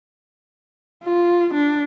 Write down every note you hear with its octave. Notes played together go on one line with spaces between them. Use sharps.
F4
D4